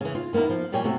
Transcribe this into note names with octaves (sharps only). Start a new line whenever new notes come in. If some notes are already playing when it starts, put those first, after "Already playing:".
C#3 E3
F4
D#3 A#3 B3 E4 A#4
F3
F2 A#2 G3 G4 C#5 G#5
C3 A3 F#4